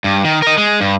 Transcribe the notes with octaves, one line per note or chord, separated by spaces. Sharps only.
G2
D#3
A#4 D#5
G#3
G2